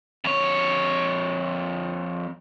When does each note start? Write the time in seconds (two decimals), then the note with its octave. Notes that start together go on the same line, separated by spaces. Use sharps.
0.24 F2 C#5